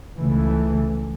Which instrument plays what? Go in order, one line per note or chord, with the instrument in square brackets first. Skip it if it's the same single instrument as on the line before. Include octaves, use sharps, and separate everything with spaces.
[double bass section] C#2 C#3 E3 A3